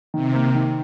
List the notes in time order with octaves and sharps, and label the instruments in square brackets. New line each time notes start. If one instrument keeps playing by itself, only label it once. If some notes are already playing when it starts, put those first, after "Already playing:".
[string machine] C3 [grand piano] D#3
[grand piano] A#3
D#3